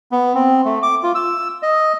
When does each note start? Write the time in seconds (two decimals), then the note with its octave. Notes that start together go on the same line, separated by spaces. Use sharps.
0.12 B3
0.35 C4
0.65 A3
0.83 D6
1.03 F4
1.15 E6
1.63 D#5